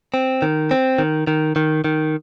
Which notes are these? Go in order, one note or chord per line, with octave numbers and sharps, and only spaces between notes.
C4
D#3
C4
D#3
D#3
D#3
D#3